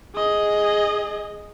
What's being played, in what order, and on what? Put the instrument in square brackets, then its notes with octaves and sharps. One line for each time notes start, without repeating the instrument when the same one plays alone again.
[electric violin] G#4 D#5